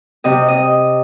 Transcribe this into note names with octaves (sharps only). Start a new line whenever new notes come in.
C3 D#5
D#5